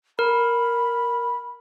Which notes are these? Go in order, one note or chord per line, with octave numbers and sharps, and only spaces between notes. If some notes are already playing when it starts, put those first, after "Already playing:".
A#4 B5